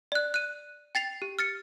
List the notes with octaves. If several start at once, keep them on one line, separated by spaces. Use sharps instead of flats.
D5 F#6
F#6 D#7
G5 A6 C7 F7
G4
F6 A6 C#7